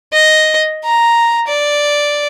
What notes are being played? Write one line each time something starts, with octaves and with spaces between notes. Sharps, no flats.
D#5
A#5
D5